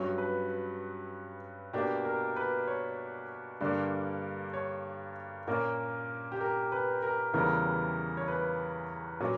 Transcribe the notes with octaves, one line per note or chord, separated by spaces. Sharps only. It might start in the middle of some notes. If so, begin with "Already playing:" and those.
Already playing: G2 F#3 C#4
B4
B2 A#3 D4 G4
A#4
B4
C#5
G2 D3 A#3 D5
C#5
A#2 A#3 C#4 A#4
G4
A#4
B4
A#4
E2 C#3 E3 G3 B3 A#4
C#5
B4
A#2 F#3 C#4